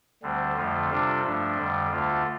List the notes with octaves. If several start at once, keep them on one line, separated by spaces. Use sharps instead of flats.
D2 D3 G3 C4
F2 D3 F3 A3 F4
C3 G3 D4 F4 A4
G2 F3 A3 D4
F2 D3 G3
D2 D3 A3 F4